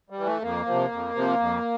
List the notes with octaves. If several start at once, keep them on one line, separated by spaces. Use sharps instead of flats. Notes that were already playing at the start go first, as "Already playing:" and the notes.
G3
E3
A3
F2 A#3
C3 F3
F2
C3 F3
F2